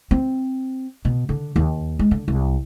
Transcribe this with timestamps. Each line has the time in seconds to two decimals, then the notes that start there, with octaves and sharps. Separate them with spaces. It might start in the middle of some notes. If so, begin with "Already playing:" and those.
0.11 C4
1.05 B2
1.29 D3
1.56 D#2
1.99 G#3
2.11 D3
2.28 C2